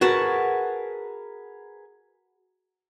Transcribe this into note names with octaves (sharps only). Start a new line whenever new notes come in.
F#4 G#4 A#4 B4 F#5 A5